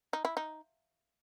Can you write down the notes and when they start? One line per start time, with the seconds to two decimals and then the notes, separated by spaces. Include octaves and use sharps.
0.13 D#4
0.25 E4
0.37 D#4